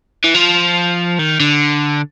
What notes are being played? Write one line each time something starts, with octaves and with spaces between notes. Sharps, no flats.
E3
F3
D#3
D3